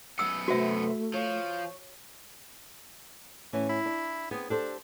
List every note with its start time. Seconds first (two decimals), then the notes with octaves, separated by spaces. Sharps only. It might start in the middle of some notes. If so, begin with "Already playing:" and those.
0.19 F#2 B3 E6
0.48 C3 A3 F#4 B4 C5 E5
1.14 F3 C#5
3.53 A2 E3 C#4
3.69 E4
3.86 D4
4.31 B3 C4 G#4
4.50 D4 G4 A4 C5